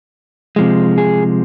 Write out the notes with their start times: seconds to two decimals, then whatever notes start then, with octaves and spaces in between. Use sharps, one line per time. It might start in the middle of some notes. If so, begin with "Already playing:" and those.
0.56 C3 F3 G#3
0.98 G#4